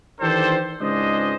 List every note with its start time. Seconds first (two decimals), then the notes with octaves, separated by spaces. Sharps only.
0.21 D#3 E3 D4 G4 A4 C5
0.81 C#2 G#2 D4 G#4 C5 D#5